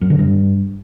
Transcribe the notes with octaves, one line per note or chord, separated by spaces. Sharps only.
F#2
D3
G2